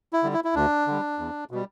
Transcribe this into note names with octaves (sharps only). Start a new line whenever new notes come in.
E4
D3 G3
E4
E4
D2 D4
D3 G3
E2
B2 G3